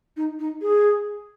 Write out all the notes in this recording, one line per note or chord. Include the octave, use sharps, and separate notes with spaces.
D#4
D#4
G#4